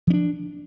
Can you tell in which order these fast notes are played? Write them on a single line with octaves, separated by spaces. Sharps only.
F3 C#4 D4